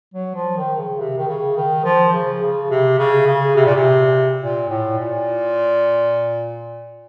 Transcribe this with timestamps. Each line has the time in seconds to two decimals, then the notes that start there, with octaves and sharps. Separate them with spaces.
0.14 F#3
0.35 F3
0.57 D#3
0.78 C#3
0.99 C3
1.17 D#3
1.28 C#3
1.56 D#3
1.84 F3
2.13 C#3
2.42 C#3
2.70 C3
2.99 C#3
3.27 C#3
3.56 C3
3.65 A#2
3.75 C3
4.41 A#2
4.69 A2
4.98 A#2